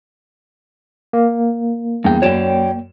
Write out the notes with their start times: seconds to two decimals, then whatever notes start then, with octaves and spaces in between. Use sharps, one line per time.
1.13 A#3
2.04 E2 G2 G5
2.22 F#2 C#5 D5 G5 E7